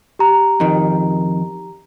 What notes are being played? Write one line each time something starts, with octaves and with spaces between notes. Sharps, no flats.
G4 A#5
F2 D#3